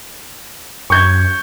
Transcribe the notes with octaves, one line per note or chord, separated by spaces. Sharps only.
F#2 C#6 G6 G#6